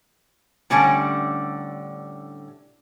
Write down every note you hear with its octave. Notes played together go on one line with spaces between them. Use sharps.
A2 D3 G3 C#4 A5